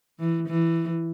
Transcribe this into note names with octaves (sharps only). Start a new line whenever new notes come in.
E3
E3